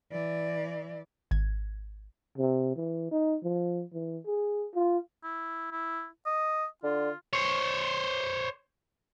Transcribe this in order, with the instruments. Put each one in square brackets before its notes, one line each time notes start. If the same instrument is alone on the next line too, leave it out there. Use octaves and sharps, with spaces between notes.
[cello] E3 D5
[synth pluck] G#1 G#6
[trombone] C3
E3
D#4
F3
E3
G#4
F4
[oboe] E4
E4
D#5
[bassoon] D3 [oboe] F4
[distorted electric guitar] C5 C#5